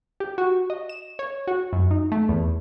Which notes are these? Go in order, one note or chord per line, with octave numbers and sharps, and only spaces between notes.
G4
F#4
D#5
E7
C#5
F#4
F#2
D#4
A3
E2